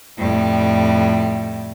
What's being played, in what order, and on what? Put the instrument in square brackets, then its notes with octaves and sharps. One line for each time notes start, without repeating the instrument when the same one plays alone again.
[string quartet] F2 A2 G3